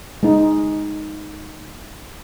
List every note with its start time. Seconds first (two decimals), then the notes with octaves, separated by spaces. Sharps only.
0.23 G#3 D#4